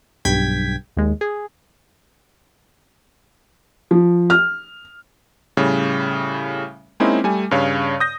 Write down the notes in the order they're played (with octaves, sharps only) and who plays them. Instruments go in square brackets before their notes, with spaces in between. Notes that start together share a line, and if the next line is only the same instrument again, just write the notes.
[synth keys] B1 G2 G5 G#6 B6
D#2 G#3
G#4
[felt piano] F3
F6
[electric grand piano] A2 C#3 G3
G#3 A#3 C4 C#4 D#4 E4
G3 A3 G#5
G2 C#3 C#5 F5
D#6 G6 A#6